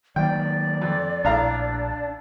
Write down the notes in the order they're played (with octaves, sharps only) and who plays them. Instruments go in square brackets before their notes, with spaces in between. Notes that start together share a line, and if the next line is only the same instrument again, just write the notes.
[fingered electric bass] D#3 F#3 A#3 [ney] D5 [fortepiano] G5
[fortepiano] F2
[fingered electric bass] A#1 [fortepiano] A2 F5 A#5 [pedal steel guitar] D4